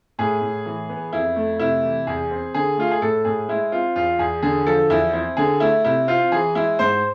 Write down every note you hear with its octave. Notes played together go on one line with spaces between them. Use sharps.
A2 G#4
A2
E3
B3
F2 E4
A3
C3 E4
E3
E2 G#4
C4
D3 G#4
A3 F4
G#4
A2 A4
A2 G#4
G#3 E4
C4 F4
E2 F4
E2 G#4
D3 G#4
F3 A4
E2 E4
C4 E4
D3 G#4
A3 E4
C3 E4
C4 F4
E3 G#4
G#3 E4
G#2 C5